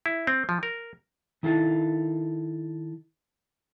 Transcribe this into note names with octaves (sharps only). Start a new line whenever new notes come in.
E4
C4
F3
A#4
D#3 E4 A4 F5 A5